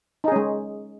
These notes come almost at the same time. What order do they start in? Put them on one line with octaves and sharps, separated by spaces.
D#4 G#4 C#4 G#3